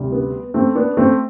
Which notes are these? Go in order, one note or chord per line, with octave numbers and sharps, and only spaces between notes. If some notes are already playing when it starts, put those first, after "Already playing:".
Already playing: D2 C3 G3
B3
A3 C4
B3 D4
A3 C4